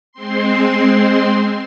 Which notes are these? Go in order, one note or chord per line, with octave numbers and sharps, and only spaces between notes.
G#3 C4 C6